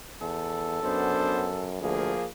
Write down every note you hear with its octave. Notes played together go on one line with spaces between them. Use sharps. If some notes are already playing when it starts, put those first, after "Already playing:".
E2 A4
F#2 B3 D4 C5
D2 F3 A#3 G#4